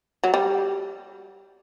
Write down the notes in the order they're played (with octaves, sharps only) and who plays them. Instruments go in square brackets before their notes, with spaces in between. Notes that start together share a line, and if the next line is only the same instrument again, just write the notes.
[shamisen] F#3
G3